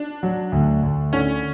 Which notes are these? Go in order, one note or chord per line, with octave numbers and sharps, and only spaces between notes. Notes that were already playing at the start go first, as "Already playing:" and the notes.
Already playing: D4
F#3
D2
D2
D3 C#4